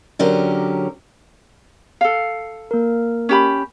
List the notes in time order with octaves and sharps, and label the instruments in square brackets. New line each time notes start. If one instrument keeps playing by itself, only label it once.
[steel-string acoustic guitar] D3 F#3 C#4 G4 A#4
[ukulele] A4 F5
[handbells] A#3 A#4
[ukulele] C#4 G4 B5